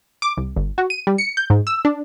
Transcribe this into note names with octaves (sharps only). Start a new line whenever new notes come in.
D6
C2
G1
F#4
D#7
G3
C#7
G6
G#2
E6
D4